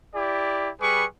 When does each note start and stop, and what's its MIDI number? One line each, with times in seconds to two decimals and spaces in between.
0.15 0.70 64
0.15 0.70 67
0.15 0.70 74
0.81 1.05 55
0.81 1.05 68
0.81 1.05 71
0.81 1.05 85